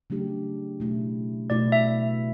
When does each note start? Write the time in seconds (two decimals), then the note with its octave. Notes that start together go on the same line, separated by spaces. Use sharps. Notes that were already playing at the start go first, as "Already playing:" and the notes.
0.10 C#3 F#3 A3 D4 G4
0.80 B2 A3 E4
1.50 B2 A3 E4 D5
1.72 E5